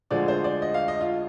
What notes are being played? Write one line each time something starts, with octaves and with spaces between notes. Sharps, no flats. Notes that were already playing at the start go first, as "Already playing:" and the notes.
D2 D3 F3 G#3 D5
C5
D5
D#5
F5
D#5
F4